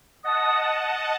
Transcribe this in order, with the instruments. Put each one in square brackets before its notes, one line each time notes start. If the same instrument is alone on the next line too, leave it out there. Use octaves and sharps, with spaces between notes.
[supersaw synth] D#5 F#5 A5 [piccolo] D#6